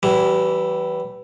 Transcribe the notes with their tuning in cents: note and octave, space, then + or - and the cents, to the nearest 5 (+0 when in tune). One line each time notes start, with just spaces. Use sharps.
E3 +0 G3 -40